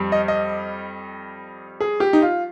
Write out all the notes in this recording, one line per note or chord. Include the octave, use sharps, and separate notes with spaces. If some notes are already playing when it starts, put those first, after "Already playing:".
Already playing: F2 G3
D#5
D#5
G#4
G4
D#4
F4